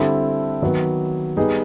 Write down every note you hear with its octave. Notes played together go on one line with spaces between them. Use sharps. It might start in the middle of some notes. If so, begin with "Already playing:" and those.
Already playing: D3 G3 C4 E4 A4
D#3 F#3 B3
G3 B3 D#4 G#4